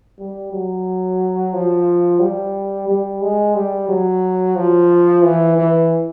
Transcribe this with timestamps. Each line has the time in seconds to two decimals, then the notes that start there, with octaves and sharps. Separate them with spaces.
0.19 G3
0.53 F#3
1.54 F3
2.20 G3
2.88 G3
3.22 G#3
3.55 G3
3.89 F#3
4.56 F3
5.24 E3
5.58 E3